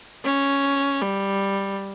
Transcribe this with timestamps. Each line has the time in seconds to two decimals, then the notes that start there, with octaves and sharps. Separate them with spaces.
0.24 C#4
1.02 G3